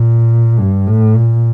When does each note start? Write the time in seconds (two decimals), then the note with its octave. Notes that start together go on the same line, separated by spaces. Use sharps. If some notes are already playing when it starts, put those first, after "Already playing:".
Already playing: A#2
0.59 G2
0.87 A2
1.16 A#2